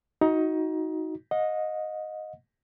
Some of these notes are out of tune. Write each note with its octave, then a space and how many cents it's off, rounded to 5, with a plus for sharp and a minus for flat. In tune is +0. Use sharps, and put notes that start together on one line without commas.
D#4 +20 F#4 +0
D#5 +0 F#5 -45